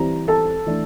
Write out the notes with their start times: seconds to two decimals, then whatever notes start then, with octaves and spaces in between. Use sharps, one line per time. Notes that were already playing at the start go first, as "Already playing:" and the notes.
Already playing: E3 G3 C4 A#5
0.28 A4 A5
0.66 E3 A3 D4